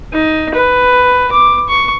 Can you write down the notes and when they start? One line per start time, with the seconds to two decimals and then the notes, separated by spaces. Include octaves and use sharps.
0.13 D#4
0.54 B4
1.32 D6
1.69 C#6